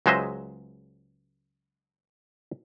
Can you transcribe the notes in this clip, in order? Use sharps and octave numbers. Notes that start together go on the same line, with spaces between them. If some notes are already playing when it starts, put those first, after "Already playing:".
C#2 F#3 G#3 C5 D#5 E5